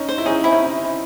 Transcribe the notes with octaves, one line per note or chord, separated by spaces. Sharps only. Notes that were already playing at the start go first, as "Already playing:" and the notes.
Already playing: C#4 D#4
C5
E4
C#4 D#4 G#4
C4 E4
C#4